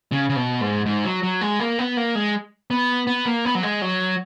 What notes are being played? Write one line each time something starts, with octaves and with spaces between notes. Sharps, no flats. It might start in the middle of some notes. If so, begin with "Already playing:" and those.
C#3
C#3
B2
G#2
G#2
F#3
F#3
G#3
A#3
B3
A#3
G#3
B3
B3
A#3
B3
F#3
G#3
F#3